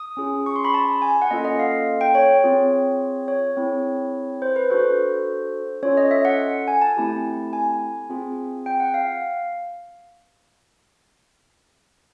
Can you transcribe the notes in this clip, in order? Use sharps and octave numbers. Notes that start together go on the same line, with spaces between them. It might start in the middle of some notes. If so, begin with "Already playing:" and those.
Already playing: D#6
C#4 F4 G#4
C#6
C6
B5
A5
G#5
F#5
A#3 C#4 F4 A4 D#5
D#5
F5
G5
C#5
C4 F4 G#4
C#5
C4 E4 G#4
C5
B4
D4 F#4 A4 C5
C#4 F4 A4 C#5
D#5
E5
F#5
G#5
A5
A3 C4 E4 G4
G#5
C4 F4 G#4
G5
F#5
F5